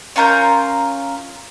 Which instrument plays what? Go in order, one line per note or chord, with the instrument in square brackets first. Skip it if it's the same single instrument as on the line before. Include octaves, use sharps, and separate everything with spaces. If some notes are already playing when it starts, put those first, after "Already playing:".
[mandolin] C#4 F4 A#4 G6